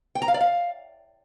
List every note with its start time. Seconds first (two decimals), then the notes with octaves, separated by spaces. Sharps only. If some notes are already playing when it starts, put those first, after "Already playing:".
0.15 G5
0.22 A#5
0.28 F5
0.34 D5
0.41 F5